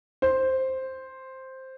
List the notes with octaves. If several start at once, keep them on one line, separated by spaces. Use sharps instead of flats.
C5